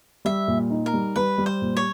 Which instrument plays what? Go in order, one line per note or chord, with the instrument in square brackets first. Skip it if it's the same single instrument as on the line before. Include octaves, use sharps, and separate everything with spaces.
[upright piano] G3 [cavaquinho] E5
[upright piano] A#2
D#4
[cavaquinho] A#4
[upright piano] G3
[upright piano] G3 [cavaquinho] B4
[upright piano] G3
[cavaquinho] C5
[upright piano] A#2
[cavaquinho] C#5